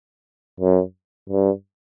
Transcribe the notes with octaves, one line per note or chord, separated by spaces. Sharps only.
F#2
G2